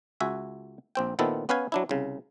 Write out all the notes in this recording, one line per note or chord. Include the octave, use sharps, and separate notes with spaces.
C#2 F#4 E5 G#5
A#1 C4 G5
A#2 D#3 B3 C4 E4 A4
B3 C#4 B4 F5 G#5
F#3 D4 E4
C2 C#3